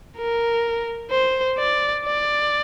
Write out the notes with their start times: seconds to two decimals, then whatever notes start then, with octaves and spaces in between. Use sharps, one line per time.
0.17 A#4
1.11 C5
1.58 D5
2.06 D5